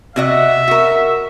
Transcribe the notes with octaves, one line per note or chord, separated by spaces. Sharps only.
C3 F#4 D#5 E5
F#4 A#4